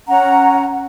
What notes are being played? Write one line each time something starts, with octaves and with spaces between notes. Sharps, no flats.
C#4 F#5 A#5